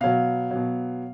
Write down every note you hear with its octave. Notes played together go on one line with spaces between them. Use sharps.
B2 F#3 F5
B2 F#3